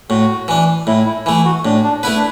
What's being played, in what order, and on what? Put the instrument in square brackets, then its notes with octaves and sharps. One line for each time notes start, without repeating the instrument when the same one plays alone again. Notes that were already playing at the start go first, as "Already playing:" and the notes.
[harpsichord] A2 [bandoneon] F#4
[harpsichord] E3 D4
[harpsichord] A2 [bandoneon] E4
[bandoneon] E4
[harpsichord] E3 A3 [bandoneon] E4
[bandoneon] F#4
[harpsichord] A2 [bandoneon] D4
[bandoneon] D4
[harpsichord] A3 E4 B4 [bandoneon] B3
[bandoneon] D4